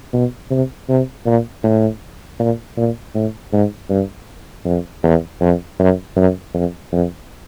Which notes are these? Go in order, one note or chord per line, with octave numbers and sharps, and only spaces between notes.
B2
C3
C3
A#2
A2
A#2
A#2
A2
G#2
G2
F2
E2
F2
F#2
F#2
F2
F2